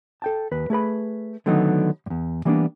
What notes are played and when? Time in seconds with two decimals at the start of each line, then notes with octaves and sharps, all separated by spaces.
0.22 A4 G5 A5
0.51 D#2 B4
0.70 A3 G#4 B4 B5
1.46 D3 D#3 F#3 A3 B3 D#4
2.06 E2 G2
2.45 E3 G3 A#3 B3 C#4 D4